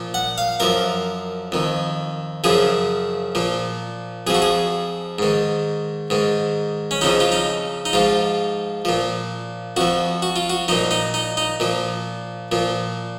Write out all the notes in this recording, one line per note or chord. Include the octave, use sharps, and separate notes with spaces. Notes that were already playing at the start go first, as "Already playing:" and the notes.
Already playing: A#2 F3
F#5
F5
F#2 F3 A#4
F2 D#3
F#2 C#3 F3 G#4
A#2 F3
F2 F3 F#4 G#4
G#4
G#2 D#3
G#2 D#3
C#4
F2 C#3 F3 D#4
F4
D#4
D#4
G#2 F3 F4
A#2 F3
F2 F3 F#4
F#4
F4
F#4
A#2 F3 D#4
D#4
D#4
D#4
A#2 F3
A#2 F3